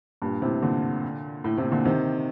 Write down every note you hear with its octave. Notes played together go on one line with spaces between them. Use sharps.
G2 A#2
A2 C3
A#2 D3
A2
A2 C3
A#2 D3
C3 D#3